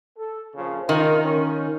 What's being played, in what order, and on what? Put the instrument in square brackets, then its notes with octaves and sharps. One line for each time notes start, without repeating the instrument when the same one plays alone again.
[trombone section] A4
A#1 C#3 F3
[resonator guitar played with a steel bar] D#3 [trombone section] D#4 F4 A#4
[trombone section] C#4